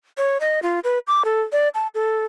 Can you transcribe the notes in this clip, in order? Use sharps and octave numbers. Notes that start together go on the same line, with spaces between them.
C#5
D#5
F4
B4
D6
A4
D5
A5
A4